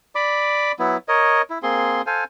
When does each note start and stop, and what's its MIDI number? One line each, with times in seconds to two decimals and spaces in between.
0.15 0.72 74
0.15 0.72 83
0.15 0.72 86
0.79 0.97 54
0.79 0.97 59
0.79 0.97 64
1.08 1.42 70
1.08 1.42 73
1.08 1.42 75
1.50 1.58 64
1.63 2.02 58
1.63 2.02 60
1.63 2.02 68
1.63 2.02 84
2.06 2.24 69
2.06 2.24 72
2.06 2.24 77
2.06 2.24 80